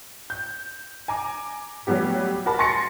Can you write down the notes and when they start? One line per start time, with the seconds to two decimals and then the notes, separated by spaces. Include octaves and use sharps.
0.30 G6
1.08 G#5 A#5 D6
1.87 F#3 G3 A3 B3 G4
2.46 F#4 A#4 A5 B5
2.59 G#5 C6 A6 A#6 C#7